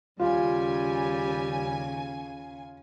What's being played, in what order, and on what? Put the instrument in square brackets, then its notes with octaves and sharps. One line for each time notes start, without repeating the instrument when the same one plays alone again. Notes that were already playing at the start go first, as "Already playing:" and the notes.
[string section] D#2 C#3 G#5 [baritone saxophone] G3 [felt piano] F4